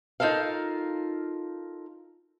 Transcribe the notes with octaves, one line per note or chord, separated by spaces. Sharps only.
D#4 F4 A4 A#4 F5